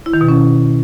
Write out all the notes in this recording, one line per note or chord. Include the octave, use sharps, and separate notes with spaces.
E4
D#3
B2
C#4